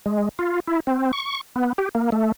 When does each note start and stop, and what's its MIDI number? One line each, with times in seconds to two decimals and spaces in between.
0.06 0.29 56
0.39 0.60 65
0.67 0.80 64
0.87 1.11 60
1.13 1.41 85
1.56 1.73 59
1.78 1.89 67
1.95 2.10 58
2.12 2.32 57